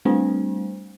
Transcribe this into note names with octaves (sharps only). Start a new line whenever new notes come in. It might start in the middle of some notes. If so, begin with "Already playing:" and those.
G3 A3 C4 D4 C5